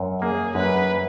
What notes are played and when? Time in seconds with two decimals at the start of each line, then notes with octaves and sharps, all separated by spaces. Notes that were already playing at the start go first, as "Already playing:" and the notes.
Already playing: F#2
0.21 A#3 G#4
0.55 F#2 B4